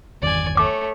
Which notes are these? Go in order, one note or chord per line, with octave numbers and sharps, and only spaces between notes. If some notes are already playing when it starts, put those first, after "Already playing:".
G1 E2 D#3 D5 G#5
A3 C#5 D6